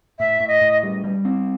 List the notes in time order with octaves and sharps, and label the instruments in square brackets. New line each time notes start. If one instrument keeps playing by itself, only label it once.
[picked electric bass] A2 [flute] E5
[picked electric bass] A2
[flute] D#5
[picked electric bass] A2
G3
G3
C4